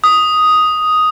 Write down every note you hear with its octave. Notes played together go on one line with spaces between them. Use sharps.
D#6